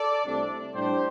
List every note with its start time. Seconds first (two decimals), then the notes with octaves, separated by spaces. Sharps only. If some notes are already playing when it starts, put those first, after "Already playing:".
Already playing: A4 D5
0.26 C2 C3 A3 D4
0.74 A2 G3 D4 G4 C5